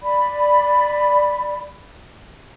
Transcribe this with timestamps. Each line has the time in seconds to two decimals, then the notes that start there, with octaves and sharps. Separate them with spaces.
0.02 D5 B5